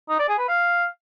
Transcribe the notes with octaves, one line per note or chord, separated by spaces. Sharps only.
D#4
D5
G#4
B4
F5